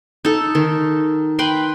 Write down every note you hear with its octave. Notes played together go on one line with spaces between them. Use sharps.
D#4 A4
D#3
B4 G5 B5 C6